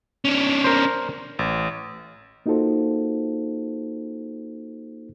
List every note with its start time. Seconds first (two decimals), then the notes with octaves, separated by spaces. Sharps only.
0.25 C#4 D4
0.64 A#4 C5
1.39 A1
2.46 A#3 D#4 F4 F#4 A4 C5